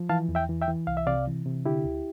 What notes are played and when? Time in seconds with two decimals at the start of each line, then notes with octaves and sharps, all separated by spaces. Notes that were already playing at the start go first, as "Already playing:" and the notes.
Already playing: F3
0.09 E3 F5 A5
0.29 E2
0.35 E5 G5
0.49 E3
0.62 E5 G5
0.68 E3
0.87 C2 F5
0.97 E5
1.07 C3 D5 F5
1.27 E3
1.46 C3
1.66 D3 E4 G4
1.85 D2